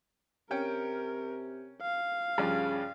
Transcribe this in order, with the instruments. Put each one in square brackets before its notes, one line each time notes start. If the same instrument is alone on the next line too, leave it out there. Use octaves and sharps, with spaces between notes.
[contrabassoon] C3 [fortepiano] C#4 G5 [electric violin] A#4
[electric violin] F5
[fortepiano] G2 F3 D5 [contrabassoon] C#3